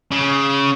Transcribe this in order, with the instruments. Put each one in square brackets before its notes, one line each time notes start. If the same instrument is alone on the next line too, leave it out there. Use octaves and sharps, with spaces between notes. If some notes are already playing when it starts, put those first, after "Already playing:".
[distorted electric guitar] C#3